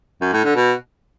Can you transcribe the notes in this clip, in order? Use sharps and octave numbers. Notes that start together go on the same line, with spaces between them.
F#2
A2
D3
B2